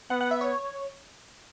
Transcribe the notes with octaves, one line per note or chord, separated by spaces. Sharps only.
B3 F#5
F#5
E5
C#5